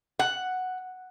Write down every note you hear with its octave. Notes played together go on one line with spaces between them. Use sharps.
F#5